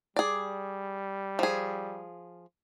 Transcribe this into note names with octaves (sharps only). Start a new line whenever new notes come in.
G3 G#4 D5
F3 G#4